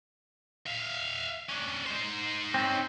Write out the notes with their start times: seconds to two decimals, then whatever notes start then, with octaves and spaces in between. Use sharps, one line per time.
0.67 E5 F5
1.49 C#4 D4
1.86 D#4 C5
2.54 C4 C#4